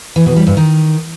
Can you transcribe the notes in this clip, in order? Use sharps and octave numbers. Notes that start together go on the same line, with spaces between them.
E3
B2
G3
G2
D#3